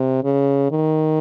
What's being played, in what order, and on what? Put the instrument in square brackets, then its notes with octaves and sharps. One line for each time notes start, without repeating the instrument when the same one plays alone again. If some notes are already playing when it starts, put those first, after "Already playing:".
Already playing: [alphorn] C3
C#3
D#3